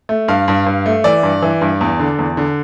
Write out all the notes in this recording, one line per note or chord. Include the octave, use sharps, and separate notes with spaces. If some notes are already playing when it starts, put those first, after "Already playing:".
A3
G2 F5
G2
G2
A3
E3 D5
G2
E3
G2
E2
D3
E2
D3